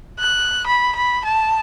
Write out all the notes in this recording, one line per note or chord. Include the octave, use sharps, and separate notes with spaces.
F#6
B5
B5
A5